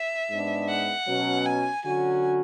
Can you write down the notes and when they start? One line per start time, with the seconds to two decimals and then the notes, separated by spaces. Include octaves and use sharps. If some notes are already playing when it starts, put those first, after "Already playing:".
Already playing: E5
0.31 G#2 G#3 B3 D4
0.69 F#5
1.07 B2 F#3 C#4
1.46 G#5
1.85 D3 F#3 C#4 F#4 G#5